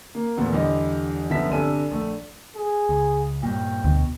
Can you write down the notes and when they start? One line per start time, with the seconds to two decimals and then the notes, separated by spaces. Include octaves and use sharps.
0.15 A#3
0.37 E2 A#2 A3 B3
0.53 E2 D3 G3 G4 D#5
1.29 G1 F#2 F3 B3 E5 B6
1.50 G1 C3 D4 A4 G#5 D#7
1.91 A#1 A3
2.55 G#4
2.89 C#2
3.43 G2 A#2 G5
3.84 D2 B2